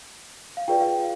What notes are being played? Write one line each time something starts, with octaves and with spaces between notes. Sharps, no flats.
F5
F4 G#4 B4 D5 G5
F5